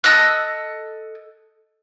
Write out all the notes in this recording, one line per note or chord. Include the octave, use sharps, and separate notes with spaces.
A4 D#5 E6 F#6